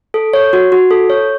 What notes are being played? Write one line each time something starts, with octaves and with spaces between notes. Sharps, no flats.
A4
C#5
F#4
F#4
A4
C#5